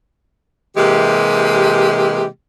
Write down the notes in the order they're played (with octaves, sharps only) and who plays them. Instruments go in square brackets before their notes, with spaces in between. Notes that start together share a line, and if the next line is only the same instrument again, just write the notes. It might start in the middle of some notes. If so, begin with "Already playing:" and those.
[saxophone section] C3 E3 G#3 A#3 G4